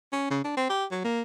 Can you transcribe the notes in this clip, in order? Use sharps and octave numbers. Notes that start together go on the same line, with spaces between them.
C#4
C#3
D4
C4
G4
F#3
A#3